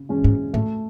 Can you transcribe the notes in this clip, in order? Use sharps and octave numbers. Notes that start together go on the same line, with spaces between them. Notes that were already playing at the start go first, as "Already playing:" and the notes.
Already playing: C#3
E3 G#3 C#4
G#2
A2 A3